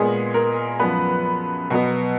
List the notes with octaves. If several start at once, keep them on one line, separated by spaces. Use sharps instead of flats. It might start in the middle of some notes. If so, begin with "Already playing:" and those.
Already playing: A#2 G#3 B3 G#4
A#4
F#2 F3 B3 B4
B2 F#3 B3